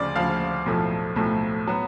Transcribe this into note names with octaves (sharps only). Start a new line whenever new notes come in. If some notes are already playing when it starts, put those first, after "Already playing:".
Already playing: D2 C#3 F3 D5
D2 C#3 F3 F5
B1 A2 F3 A3
B1 A2 F3 A3
F#3 B3